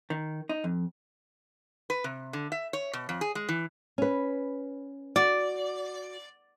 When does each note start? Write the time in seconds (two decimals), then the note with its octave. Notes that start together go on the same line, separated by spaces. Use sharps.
0.10 D#3
0.49 D#4
0.64 F2
1.90 B4
2.04 C3
2.33 D3
2.52 E5
2.73 C#5
2.93 B2
3.09 F2
3.21 G#4
3.35 G#3
3.49 E3
3.98 C#4 B4
5.16 F#4 D5